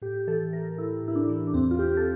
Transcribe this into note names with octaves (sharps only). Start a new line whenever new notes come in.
A2 G4
G4
E3 A4
E3 A#4
A2 E4
A2 E4
D4
E3
D4
E2 C4
F4
E2 G4
G4
A4